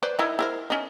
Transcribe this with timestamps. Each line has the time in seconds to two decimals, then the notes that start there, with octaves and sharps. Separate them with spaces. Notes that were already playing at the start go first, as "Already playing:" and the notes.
0.03 B4 C5 D5
0.19 D#4 E4 A#4
0.39 E4 A#4 C5
0.70 C#4 D#4